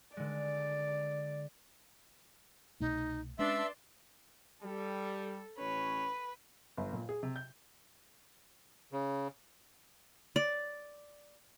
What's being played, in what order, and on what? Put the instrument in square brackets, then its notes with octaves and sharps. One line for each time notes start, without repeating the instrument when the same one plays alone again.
[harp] D3 G#3 [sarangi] D5
[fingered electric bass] C2 B2 A3 [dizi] D#4
[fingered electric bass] G#3 C#4 [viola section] D4 A5 C6 [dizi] B4 [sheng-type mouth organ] E5
[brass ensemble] G3 [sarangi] A4
[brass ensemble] A1 C#4 C#5 [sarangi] B4
[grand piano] G1
A#2
G#4
C3
G6
[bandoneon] C#3
[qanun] D5